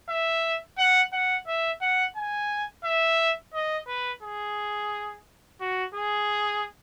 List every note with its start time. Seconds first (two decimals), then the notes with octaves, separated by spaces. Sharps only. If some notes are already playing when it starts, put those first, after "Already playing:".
0.09 E5
0.78 F#5
1.13 F#5
1.47 E5
1.81 F#5
2.16 G#5
2.85 E5
3.54 D#5
3.88 B4
4.23 G#4
5.60 F#4
5.95 G#4